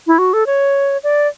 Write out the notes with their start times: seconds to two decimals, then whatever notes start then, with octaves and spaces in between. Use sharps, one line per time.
0.07 E4
0.18 F#4
0.33 A4
0.46 C#5
1.03 D5